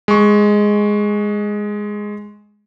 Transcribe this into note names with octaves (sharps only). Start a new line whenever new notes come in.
G#3 C#6